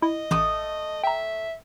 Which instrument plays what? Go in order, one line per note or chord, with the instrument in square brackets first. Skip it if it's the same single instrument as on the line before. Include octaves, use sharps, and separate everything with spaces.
[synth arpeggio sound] E4 [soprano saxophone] D#5
[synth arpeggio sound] A1 [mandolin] A3 D6 D#6
[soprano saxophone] E5 [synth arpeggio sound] G5 A#5